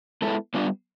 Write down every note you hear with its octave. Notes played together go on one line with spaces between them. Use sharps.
G#3 B3 E4 A4
G3 B3 D4 F4